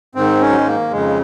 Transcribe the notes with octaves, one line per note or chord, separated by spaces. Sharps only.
G#2 D#3 C4
C#4
F#3
G#3
A#3
F2 C#3 G#3